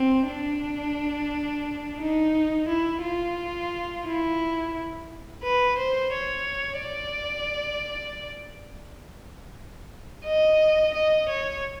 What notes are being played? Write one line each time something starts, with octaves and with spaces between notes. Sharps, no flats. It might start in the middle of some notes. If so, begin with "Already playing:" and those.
Already playing: C4
D4
D#4
E4
F4
E4
B4
C5
C#5
D5
D#5
D#5
C#5